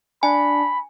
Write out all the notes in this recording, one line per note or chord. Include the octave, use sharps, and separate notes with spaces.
D4 G#5 B5